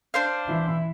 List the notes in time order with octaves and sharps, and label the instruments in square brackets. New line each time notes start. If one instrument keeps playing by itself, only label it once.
[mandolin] D4 C5 F5
[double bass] E3 E4